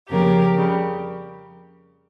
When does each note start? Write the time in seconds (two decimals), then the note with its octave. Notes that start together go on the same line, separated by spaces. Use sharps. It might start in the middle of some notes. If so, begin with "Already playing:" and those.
0.09 F2 C#3 F3 A#3 G4 A#4
0.55 F2 C#3 G3